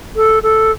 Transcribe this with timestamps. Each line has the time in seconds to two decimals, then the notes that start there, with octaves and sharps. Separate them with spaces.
0.16 A4
0.43 A4